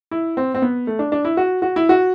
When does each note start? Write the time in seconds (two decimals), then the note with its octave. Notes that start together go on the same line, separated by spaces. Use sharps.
0.11 E4
0.37 C4
0.55 C4
0.62 B3
0.87 A3
0.99 D4
1.12 D4
1.25 E4
1.37 F#4
1.62 F#4
1.76 E4
1.89 F#4